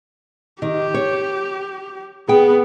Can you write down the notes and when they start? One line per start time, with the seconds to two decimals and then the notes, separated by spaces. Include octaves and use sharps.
0.62 D#3 G4
0.94 C#5
2.28 B3 G#4 G5